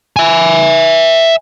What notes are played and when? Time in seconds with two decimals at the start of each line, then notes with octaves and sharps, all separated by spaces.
0.16 E5 G#5